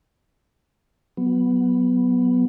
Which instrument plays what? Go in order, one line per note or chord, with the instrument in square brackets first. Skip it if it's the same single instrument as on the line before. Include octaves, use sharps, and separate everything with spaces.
[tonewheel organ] F#3 B3